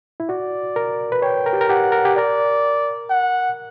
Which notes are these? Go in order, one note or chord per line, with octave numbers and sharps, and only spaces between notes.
E4
F#4 D5
A#4
B4
C#5 G5
A#4
G4
A#4
G4 F#5
A#4
G4
A#4 D5
F#5